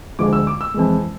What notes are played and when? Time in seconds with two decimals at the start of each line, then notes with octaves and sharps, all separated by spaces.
0.19 D2 D3 F3 G#3 D6
0.33 E6
0.47 D6
0.61 E6
0.74 F2 E3 G#3